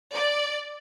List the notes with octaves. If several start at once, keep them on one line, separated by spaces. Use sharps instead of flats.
D5